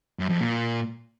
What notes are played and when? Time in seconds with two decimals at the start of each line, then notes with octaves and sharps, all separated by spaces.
0.19 F#2
0.29 F2
0.39 A#2